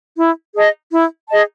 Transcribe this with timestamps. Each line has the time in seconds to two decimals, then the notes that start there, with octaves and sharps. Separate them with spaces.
0.18 E4
0.55 G#4 D#5 A5
0.92 E4
1.28 G#4 D#5 A5